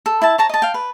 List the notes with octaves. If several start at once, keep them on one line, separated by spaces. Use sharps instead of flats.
A4
E4 E5 A5
C#5 A5 A#5
D#5 A5
F5 G5
B4